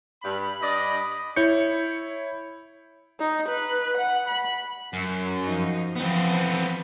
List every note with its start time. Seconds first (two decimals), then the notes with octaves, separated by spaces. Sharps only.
0.23 G2 B5
0.62 G2 D5 D#5
1.36 E4 C#5 G6 C#7
3.20 D#4
3.49 B4
3.98 F#5
4.28 B5
4.93 F#2
5.44 F3 D#4
5.96 E3 F3 B3 C4